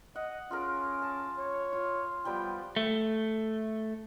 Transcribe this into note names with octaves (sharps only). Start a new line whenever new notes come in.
D#5 F#5
C#4 F4 G#4 A#4
A5
C#5
F4
F3 G3 B3 G5
A3